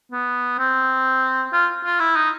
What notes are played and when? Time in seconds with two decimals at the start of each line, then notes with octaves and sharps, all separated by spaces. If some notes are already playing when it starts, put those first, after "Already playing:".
0.12 B3
0.59 C4
1.53 F4
1.85 F4
2.00 E4
2.16 D#4